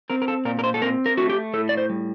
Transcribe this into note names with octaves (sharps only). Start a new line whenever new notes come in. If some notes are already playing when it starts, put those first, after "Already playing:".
C4 A#4
A#4
A4
A#2 A#4
A#4
C5
A4
C4 A#4
A#4
A3 F#4
G4
A2 A4
D5
C5
G3